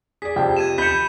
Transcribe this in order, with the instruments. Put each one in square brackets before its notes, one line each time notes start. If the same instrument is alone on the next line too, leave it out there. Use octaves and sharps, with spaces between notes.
[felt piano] G#4 D5 [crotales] B6
[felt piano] F2 C3 [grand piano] G5
[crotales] G#6 D#7 E7
[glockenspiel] B5 C#7 [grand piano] G6 [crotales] B6 E7